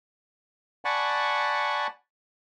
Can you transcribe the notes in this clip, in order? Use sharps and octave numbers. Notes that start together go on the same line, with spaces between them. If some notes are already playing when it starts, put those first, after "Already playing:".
D5 F#5 G#5 A5 B5 C#6